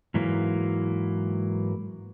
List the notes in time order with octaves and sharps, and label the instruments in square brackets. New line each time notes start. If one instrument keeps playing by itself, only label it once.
[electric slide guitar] G#2 E3 F#3 A#3